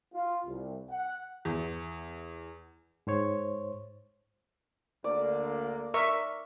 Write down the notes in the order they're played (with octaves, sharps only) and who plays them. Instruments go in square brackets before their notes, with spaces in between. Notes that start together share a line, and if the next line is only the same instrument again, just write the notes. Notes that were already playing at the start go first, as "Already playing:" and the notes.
[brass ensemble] F4
C2
F#5
[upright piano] E2
[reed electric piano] G#2 C5 C#5
[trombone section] D2 D3 A#3 [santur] D5
[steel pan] A#4 E5 C#6